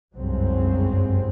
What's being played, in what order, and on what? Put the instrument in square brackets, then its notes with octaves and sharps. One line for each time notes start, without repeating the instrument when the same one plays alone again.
[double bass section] G1 C2 F#2 F#3 G#3 C4